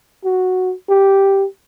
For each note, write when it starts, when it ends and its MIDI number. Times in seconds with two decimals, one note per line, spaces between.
0.25 0.74 66
0.89 1.45 67